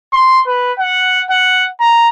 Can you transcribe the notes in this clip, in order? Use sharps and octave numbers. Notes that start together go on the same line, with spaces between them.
C6
B4
F#5
F#5
A#5